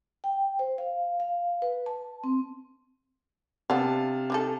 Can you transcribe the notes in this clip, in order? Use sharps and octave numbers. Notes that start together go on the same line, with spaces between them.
G5
C5
F5
F5
B4
A5
C4
C3 B3 D4 F5 A5
D4 D#4 A4